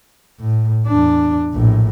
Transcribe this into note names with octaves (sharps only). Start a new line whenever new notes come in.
A2
E2 D4
A#1 A2